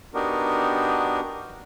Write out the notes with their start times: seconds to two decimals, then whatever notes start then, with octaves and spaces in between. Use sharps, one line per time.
0.14 B3 D4 D#4 F#4 G4 A#4